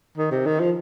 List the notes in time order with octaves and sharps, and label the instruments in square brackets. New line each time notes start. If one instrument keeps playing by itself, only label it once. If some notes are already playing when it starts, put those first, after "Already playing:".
[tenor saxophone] D#3
C3
D#3
F3